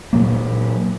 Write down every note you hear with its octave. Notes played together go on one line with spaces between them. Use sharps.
A#2 F#3 A#3